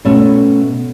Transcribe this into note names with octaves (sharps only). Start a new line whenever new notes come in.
B2 A3 C#4